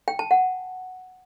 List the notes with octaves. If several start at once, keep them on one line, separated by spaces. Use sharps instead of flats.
G5
A5
F#5